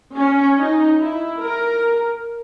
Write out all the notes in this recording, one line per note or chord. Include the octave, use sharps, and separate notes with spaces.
C#4
D#4
E4
A#4